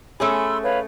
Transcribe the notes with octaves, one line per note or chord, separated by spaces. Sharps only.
A3 C#4 G#4 B5 C6 E6
B4 C#5 F5